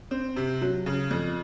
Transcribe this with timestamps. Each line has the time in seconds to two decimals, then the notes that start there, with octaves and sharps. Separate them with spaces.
0.11 C4
0.36 C3
0.61 F#3
0.86 C#3
1.11 F2